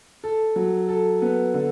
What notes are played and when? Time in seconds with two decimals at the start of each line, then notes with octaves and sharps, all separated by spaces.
0.24 A4
0.56 F#3
0.89 A4
1.22 B3
1.54 D3